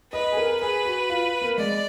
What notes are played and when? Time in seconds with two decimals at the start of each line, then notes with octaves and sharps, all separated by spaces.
0.13 B4 D#5
0.32 G#4
0.37 A#4
0.61 G#4 B4
0.85 F#4
1.10 F4
1.41 A#3
1.58 G#3 D5